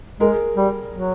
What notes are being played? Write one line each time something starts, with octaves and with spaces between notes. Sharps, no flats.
G#3 G#4 A#4
G3
F#3